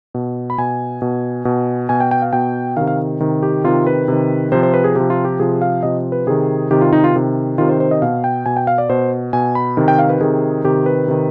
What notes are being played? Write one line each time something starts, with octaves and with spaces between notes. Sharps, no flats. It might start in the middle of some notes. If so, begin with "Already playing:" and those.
B2
B5
B2 G#5
B2
B2
B2 G#5
G5
G5
F5
B2 G5
C3 D#3 F5
F5
C3 D#3
G4
C3 D#3 F4
B4
C3 D#3
C3 F3 C5
C5
B4
G#4
C3 F3 G4
F4
G4
C3 F3 G#4
F5
C3 F3 D#5
B4
C3 D#3 G#4
C3 D#3 G4
F4
D#4
F4
C3 D#3
C3 D#3 F4
C5
C5
D#5
B2 F5
G5
B2 G#5
G5
F5
D5
B2 C5
B2 G#5
B5
C3 D#3
G5
F5
B4
C3 D#3 G#4
C3 D#3 G4
B4
C3 D#3